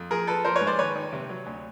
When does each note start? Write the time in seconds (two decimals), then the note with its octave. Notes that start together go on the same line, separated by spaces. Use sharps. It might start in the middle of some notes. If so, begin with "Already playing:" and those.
Already playing: F2
0.11 F3 G#4 A#4
0.27 F3 A4 B4
0.45 F3 A#4 C5
0.56 B4 C#5
0.61 G#2
0.67 C5 D5
0.79 D#3 B4 C#5
0.95 D#3
1.13 C3
1.30 F#3
1.46 D2